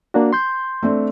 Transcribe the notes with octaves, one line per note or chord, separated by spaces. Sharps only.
A#3 D4 F#4
C6 G6
A3 C4 D4